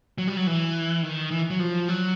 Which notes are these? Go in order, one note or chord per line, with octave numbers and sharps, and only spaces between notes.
F#3
G3
F#3
E3
D#3
E3
F#3
F3
F#3